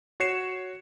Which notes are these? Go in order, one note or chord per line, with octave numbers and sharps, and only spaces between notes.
F#4 C#5 C7 C#7 E7